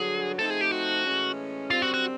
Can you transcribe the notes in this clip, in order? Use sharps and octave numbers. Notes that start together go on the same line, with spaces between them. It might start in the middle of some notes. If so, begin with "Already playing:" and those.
Already playing: G2 D3 F#3 G#4
F3 A3 C4 D#4 A4
G#4
G4
F#4
A2 E3 G#3 C#4
F#2 D3 G3 C4 F4
F#4
F#4